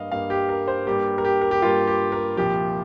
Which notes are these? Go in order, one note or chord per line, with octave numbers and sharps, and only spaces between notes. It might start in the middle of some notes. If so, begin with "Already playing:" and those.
Already playing: G2 G3 A#3 D#5 F5
G2 G3 A#3 F5
G4
A#4
C5
G2 G3 A#3 G4
A#4
G4
A#4
G4
G2 G3 A#3 F4
G4
A#4
C2 A#2 F3 G4